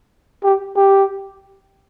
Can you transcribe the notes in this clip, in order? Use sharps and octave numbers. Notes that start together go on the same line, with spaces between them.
G4
G4